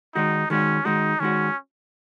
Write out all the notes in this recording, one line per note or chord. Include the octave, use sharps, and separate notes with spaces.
D#3 G#3 D#4 F#4
D#3 G#3 C#4 F#4
D#3 G#3 D#4 F#4
D#3 G#3 C#4 F#4